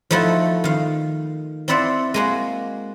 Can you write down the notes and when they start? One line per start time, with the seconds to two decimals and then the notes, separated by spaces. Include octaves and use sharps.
0.11 F3 A3 D#4 E4 F#4
0.64 D#3 F5
1.68 C4 E4 D5 E5 F#5
2.14 G#3 A#3 F#4